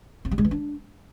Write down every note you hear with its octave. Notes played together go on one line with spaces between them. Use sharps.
C4
G3
G#3
E3
D4